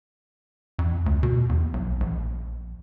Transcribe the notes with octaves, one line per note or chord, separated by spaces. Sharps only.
F2
D2
B2
E2
B1
A#1